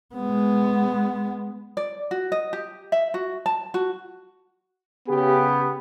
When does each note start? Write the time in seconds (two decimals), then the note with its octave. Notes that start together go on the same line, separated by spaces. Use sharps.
0.14 G#3 B3
1.77 D5
2.11 F#4
2.32 D#5
2.53 G4
2.92 E5
3.14 F#4
3.46 A5
3.74 F#4
5.08 C#3 B3 G4